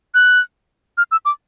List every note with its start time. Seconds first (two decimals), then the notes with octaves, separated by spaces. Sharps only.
0.15 F#6
0.98 F6
1.11 E6
1.25 D6